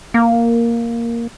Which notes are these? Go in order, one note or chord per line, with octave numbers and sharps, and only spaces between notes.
A#3